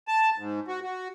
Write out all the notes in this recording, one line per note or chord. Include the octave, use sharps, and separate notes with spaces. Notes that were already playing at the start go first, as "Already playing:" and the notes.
A5
G#2
F#4
F#4